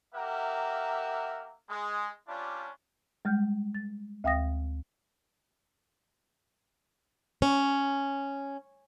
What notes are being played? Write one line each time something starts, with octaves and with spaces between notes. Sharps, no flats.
A#3 G4 A#4 E5 F#5
G#3
G3 C#4 D4 F4
G3 G#3 F6 G6
A6
D2 F5 G5 D#6 A#6
C#4